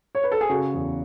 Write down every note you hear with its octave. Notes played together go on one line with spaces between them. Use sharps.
C#5
B4
A4
G#4
C#3 F#4
E2